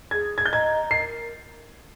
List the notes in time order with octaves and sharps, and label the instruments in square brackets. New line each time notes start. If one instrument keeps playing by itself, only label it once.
[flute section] G#4 [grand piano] G#6
[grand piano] G#6
G6
[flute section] D#5 A#5 [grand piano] G#6
[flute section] A#4 [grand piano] C7